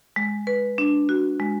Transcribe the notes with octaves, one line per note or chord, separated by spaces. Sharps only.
G#3
B4
D4
F#4
G#3